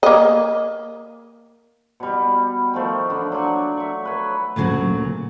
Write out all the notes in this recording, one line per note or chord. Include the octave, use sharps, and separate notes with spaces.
A#3 D#5
B2 G3
D#3 F3 A3 F5
D3 D4
F#3 D4 C6 C#6
E5 C#6
B4 C#5
D2 A#2 C#3 F#3 F#4